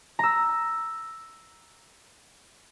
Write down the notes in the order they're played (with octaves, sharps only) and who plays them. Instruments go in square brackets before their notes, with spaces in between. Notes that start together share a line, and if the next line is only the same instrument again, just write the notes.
[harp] A#5 E6